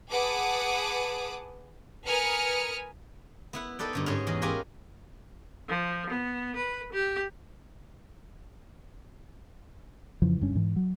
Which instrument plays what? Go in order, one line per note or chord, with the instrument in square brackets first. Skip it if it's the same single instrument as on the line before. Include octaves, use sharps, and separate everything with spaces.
[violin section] G#4 B4 F#5 A5 D6 D#6
A#4 B4 G#5 D#6 F6 C#7
[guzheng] B3 E4 F#5
D#4 A4 B4 D5 G5
G2 D3 C#5
G#2 B3 C#4 G#4 C#5
E2 G#4 D#5
C#4 F4 G4 A#4 F#5 G#5
[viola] F3
B3
B4
G4
[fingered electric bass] F2 C#3 E3 F3
F#1 G2 C#4
G#2 E3
F#3